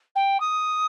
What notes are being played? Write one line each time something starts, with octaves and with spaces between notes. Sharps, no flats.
G5
D#6